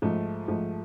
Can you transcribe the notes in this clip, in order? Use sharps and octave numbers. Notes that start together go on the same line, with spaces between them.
G#2 F3 A3
G#2 F3 A3